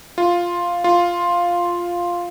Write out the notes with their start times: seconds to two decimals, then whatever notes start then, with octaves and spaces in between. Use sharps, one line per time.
0.18 F4
0.84 F4